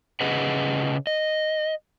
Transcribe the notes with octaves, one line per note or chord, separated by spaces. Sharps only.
C#3 G#4 B4 D#5 F#5
D#5